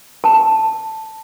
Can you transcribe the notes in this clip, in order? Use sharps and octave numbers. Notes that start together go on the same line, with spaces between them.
A5